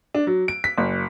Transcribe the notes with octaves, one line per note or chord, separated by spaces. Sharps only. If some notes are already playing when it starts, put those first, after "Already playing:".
D4
F#3
D7
B6
F#1